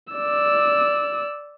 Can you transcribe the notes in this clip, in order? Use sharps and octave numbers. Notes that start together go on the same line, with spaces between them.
D5 E6